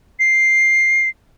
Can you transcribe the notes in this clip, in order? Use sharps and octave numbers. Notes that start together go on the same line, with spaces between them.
C7